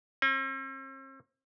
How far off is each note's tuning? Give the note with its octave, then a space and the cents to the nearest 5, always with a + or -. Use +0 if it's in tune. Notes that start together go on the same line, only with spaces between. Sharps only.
C4 +45